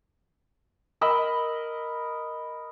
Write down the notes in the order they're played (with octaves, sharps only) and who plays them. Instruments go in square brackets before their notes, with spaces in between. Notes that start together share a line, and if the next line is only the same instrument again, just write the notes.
[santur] A#4 D#5 B5 E6